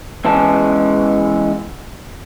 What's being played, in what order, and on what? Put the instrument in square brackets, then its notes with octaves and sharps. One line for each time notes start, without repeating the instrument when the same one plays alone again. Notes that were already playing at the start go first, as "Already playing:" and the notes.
[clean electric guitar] E2 E3 G#3 C#4 A5